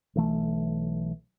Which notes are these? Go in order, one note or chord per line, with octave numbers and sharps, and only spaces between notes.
B1 E3 A3